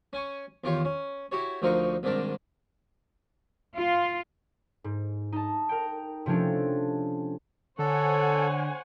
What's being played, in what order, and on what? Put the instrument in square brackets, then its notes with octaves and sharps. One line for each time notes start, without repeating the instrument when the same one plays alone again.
[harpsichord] C#4 G#5 C#6
E2 D#3 F4 G4 C#5
C#4
E4 F#4 G4 C#5
D2 D3 F3 D#4 A#4 C#6
C2 G#2 D#3 D4 A#4 A5
[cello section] F4
[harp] G#2
D#4 A5
A#4 G5
C3 F3 A3 C#4 D4
[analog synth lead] D3 [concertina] A4 [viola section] C5 F#5 G#5 [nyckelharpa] C#5